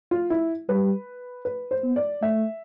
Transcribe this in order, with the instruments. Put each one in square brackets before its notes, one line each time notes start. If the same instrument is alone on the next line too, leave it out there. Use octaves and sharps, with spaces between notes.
[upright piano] F4
E4
[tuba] G3 [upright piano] B4
[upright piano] B4
C5
[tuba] B3
[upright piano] D5
[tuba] A3 [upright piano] E5